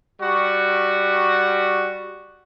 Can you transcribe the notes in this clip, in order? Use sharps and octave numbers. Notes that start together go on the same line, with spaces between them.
G3 F#4